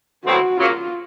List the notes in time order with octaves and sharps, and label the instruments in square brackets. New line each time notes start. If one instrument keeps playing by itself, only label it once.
[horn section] B2 F#3 A3 C4 E4 [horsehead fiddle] F#4
[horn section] C#3 F#3 A#3 [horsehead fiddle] F4